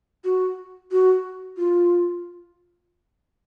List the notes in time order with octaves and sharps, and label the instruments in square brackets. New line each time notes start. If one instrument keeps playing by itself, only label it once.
[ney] F#4
F#4
F4